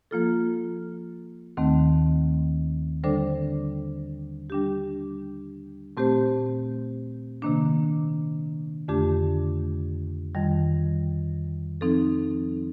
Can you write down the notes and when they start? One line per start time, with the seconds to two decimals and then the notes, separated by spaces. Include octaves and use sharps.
0.11 F3 A#3 F4 A4
1.57 D#2 D#3 A3 C4
3.04 D3 G3 D4 A4 C5
4.50 G3 D4 G4
5.97 A#2 A3 C4 G4 C5
7.42 C3 D#3 A#3 D4
8.88 F2 D3 A3 D4 G4
10.35 F2 D#3 G3
11.81 F3 C4 D#4 A4